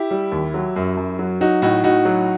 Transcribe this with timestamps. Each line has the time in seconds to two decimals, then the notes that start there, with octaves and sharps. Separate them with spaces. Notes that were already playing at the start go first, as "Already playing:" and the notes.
Already playing: E4 G4
0.11 G3
0.32 D#2
0.54 F#3
0.76 F#2
0.97 F#2
1.19 F#3
1.41 F#3 D#4 F#4
1.62 A2 D#4 F#4
1.84 A2 D#4 F#4
2.05 F#3